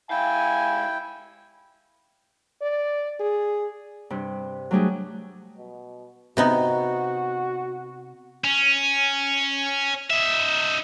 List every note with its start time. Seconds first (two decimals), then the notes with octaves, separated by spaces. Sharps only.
0.10 G#2 E4 F5 G5 G#5
2.62 D5
3.20 G#4
4.10 G2 C3
4.71 F#3 G3 A3 D4 G4 G#4
5.58 B2
6.37 C3 B3 D#4 F#4
8.44 C#4
10.10 D#4 E5